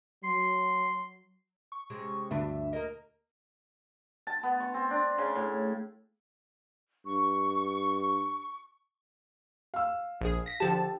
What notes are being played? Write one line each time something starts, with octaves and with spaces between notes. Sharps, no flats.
F#3 C6
C#6
C3 G#3 C#4
D2 G2 D4 B4 E5
A#3 A#4 D#5
A5
B3
C#6
C4
D4
C#3
A2
G2 C#6
F5 E6
A#1 G#4
A#6 B6
D3 F3 G4 A5